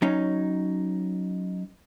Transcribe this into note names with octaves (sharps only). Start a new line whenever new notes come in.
F#3 C#4 D#4